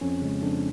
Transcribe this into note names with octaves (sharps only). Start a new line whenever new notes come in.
F2 C#4
C#3 G#3
F2 D4